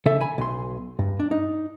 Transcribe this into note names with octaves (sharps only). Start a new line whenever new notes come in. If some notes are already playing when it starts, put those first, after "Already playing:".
C#3 A4 E5
G#5 B5
B1 C6
G2
D4
D#4